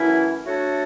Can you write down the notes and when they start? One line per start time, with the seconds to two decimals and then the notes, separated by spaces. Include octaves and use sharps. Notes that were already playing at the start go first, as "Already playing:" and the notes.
Already playing: F#2 E3 A3 C#4 E4
0.44 A3 D4 F#4 A4 C#5